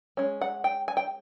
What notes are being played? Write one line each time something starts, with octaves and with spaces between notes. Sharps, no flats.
G#3 C#4
F#5
G5
G#5
G5